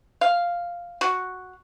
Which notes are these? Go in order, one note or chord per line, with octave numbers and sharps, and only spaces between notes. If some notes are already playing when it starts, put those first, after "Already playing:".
F5
F#4